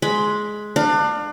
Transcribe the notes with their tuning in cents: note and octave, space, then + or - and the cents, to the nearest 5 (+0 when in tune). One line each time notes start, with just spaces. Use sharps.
G#3 +15 B5 +0
D4 +30 F5 +25